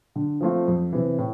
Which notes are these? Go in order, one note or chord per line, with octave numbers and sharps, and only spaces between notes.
D3
F3 A3 C4 F4
F2
C3 E3
A2